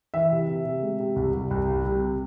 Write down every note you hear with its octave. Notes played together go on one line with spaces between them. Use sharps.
E3 E5
C3
C3
C3
G#3
C3
C2
C2
C2
C3
C3